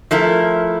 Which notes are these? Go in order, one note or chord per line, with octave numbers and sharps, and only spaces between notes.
F3 A3 E4 A#4